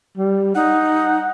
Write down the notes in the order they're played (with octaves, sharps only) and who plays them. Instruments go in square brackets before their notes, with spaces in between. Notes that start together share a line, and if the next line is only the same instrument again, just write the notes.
[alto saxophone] G3
[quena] D#4 [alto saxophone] F#5